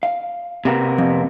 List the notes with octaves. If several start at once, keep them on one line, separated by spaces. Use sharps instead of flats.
F5
C3 A#3 B3
F2